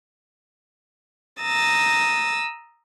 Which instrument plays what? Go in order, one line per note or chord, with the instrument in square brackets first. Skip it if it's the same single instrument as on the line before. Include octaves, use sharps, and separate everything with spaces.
[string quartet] A#5 D#6 E6 A6